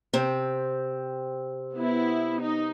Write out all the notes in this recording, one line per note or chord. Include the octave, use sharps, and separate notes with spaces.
C3 C4
B3 E4
D#4